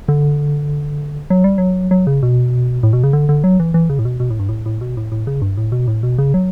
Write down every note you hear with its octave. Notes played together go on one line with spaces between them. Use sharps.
D3
F#3
G3
F#3
F#3
C#3
B2
A2
B2
C#3
D3
D3
F#3
E3
E3
C#3
A2
B2
B2
A2
G2
A2
A2
B2
A2
A2
C#3
G2
A2
B2
A2
B2
C#3
F#3